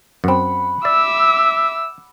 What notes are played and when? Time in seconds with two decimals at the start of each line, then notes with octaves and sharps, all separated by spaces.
0.24 F#2 C4 F#5 B5
0.85 D5 E5 D6 E6